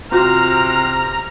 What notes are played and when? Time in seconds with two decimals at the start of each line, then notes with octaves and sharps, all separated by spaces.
0.12 C3 F4 F#4 A#5 F6